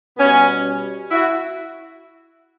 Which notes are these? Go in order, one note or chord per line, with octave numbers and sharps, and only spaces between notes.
B2 G3 B3 C#4
E4 F#4